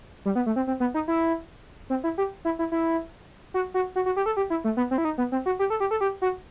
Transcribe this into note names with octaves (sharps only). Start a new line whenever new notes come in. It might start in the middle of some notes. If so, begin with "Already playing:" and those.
G3
B3
A3
C4
C4
B3
D#4
E4
C4
E4
G4
E4
E4
E4
F#4
F#4
F#4
F#4
G4
A4
G4
E4
A3
B3
C4
E4
D#4
B3
C4
F#4
G4
A4
G4
A4
G4
F#4